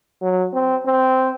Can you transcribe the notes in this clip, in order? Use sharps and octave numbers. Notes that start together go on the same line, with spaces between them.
F#3
C4
C4